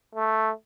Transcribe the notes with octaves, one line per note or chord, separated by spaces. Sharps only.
A3